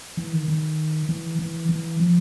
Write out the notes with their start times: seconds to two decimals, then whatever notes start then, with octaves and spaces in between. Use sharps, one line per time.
0.17 E3
0.33 D#3
0.48 D#3
1.09 E3
1.39 E3
1.69 E3
2.00 F3